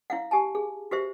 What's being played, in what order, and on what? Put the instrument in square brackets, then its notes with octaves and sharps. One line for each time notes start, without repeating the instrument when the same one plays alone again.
[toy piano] E4 F5 F#5
G4 G#5 A5
G#4
F#4 G4 C5 E5